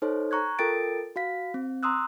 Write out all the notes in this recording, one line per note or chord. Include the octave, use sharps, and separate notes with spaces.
D#4 A4 C5 C#5
A#5 C#6 F#6 G#6
F4 A4 A#4 G5 A6 D7
F#4 F5 B6
C4
A#5 C6 D#6 E6 F#6